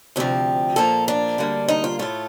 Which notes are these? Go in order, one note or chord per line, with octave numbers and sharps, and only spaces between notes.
D2 C3 F3 G4
A#2 F3 A#3 A4
D4
D2 D3 G3 A#3
D#4
F4
A2 A3 F4